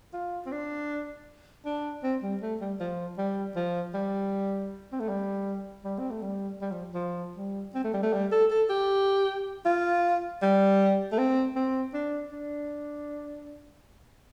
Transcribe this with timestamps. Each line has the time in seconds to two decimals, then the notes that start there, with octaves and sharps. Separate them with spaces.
0.13 F4
0.46 C4
0.51 D4
1.65 D4
2.03 C4
2.22 G3
2.42 A3
2.61 G3
2.80 F3
3.18 G3
3.56 F3
3.94 G3
4.92 C4
5.00 A3
5.09 G3
5.84 G3
5.99 C4
6.11 A3
6.22 G3
6.61 G3
6.72 F3
6.94 F3
7.37 G3
7.75 C4
7.84 A3
7.93 G3
8.03 A3
8.13 G3
8.32 A4
8.50 A4
8.69 G4
9.65 F4
10.42 G3
11.12 A3
11.18 C4
11.56 C4
11.93 D4
12.32 D4